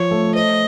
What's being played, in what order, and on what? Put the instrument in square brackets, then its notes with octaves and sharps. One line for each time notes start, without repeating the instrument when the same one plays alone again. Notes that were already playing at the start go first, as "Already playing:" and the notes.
Already playing: [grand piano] F3 [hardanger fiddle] C#5
[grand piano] A3
[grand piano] C5 [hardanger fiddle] D#5